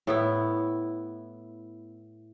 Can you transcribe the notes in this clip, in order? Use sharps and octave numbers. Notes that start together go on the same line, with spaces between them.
A2 B3 E4